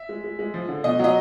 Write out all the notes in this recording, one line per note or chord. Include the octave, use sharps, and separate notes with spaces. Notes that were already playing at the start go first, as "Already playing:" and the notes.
Already playing: E5
G#3
G#3
G#3
F3
D3
B2 D#5
F#3 D#5